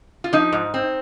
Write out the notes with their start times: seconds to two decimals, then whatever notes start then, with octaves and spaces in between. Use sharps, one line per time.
0.24 F4
0.33 F3 D#4
0.52 G#2
0.74 C4